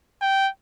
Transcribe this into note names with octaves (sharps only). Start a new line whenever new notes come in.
G5